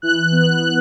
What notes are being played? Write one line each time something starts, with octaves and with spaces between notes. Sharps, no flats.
E3 F#6
B3